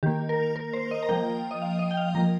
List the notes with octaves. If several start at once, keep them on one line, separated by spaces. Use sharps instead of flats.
D#3 A#3 G4
A#4
A#4
C5
D#5
A#5
F3 A#3 G5
D#5
F5
D#5
G5
F5
F3 A#3 A#5